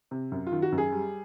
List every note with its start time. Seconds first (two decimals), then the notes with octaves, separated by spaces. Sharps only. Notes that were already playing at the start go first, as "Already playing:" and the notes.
0.11 C3
0.32 F#2
0.47 F4
0.52 D#3
0.62 F#4
0.72 F#2
0.78 G#4
0.92 G3